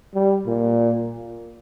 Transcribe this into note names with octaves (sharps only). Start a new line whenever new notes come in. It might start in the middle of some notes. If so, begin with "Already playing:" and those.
G3
A#2